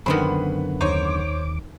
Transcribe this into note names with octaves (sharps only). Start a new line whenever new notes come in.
F#2 D3 D#3 B3 C4 B5
D#2 D#4 C5 C#5 D6